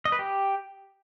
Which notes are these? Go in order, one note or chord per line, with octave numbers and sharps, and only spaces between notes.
D#5
B4
G4